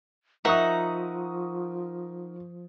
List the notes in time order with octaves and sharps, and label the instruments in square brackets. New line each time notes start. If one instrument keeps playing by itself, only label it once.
[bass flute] F3 [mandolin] D#4 F#5 [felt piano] A#4 C#6 D#6 [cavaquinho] E5